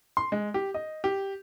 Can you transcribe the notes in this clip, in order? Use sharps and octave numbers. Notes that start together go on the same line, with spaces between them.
C6
G#3
G4
D#5
G4